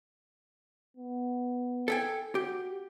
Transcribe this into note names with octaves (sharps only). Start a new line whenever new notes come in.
B3
A4 G5 G#5
F#4 G4